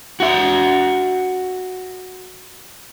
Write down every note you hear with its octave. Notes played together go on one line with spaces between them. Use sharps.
F#4 E5